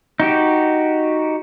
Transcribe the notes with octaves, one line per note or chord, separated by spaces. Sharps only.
D#4 F#4 G4